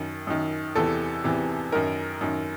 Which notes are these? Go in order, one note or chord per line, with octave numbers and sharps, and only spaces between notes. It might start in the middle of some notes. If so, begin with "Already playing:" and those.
Already playing: F#2 D#3
F#2 D#3
E2 C3 E3 A4
E2 C3 E3
F#2 D#3 A#4
F#2 D#3